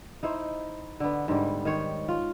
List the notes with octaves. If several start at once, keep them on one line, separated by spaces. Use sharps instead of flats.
D#4 E4 C5
D3 B3
G#2 D3 G3
D#3 C5 C#5
F4